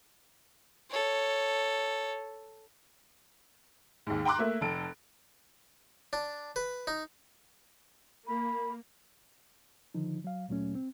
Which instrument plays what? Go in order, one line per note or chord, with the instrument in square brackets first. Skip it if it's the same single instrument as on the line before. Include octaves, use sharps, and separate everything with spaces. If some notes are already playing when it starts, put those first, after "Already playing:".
[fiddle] A4 C#5
[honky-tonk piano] D#2 G#2
G5 A#5 C6 D6 F#6
A3 A#3 E5
F1 A4 D7
[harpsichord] D4
B4
D#4
[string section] A#3 [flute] B5
[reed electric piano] D3 D#3 F3 D#4
F#3 F5
D2 A#2 F#3 A3 C#4
C4